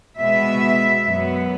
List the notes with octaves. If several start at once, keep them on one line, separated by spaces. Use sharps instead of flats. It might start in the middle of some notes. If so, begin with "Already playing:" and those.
B2 G#3 B3 E5
F#2 F#3 B3